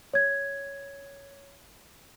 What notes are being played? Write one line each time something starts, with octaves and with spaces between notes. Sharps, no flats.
C#5 G#6